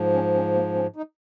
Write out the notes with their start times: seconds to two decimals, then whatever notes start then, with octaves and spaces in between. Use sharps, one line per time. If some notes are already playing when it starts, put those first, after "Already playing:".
Already playing: G#2 F3
0.13 C#4
0.34 C#4
0.54 A#3
0.75 C#4
0.96 D#4